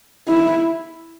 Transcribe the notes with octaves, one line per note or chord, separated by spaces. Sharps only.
E4